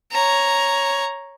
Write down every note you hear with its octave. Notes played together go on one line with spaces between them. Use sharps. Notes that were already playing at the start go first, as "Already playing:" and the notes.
C#5 A#5